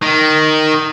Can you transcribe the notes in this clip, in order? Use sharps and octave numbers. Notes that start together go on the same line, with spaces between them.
D#3